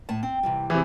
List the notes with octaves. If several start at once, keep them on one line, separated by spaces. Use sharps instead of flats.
A2 A5
C4 G5
C3 E3 G3
C3 E3 G#4